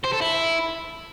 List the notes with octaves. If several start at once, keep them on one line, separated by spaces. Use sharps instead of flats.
C5
A4
E4